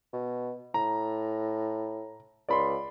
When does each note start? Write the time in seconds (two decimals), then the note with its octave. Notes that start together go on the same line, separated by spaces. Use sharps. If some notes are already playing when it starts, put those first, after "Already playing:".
0.13 B2
0.74 A2 A#5
2.49 C#2 D5 B5 C6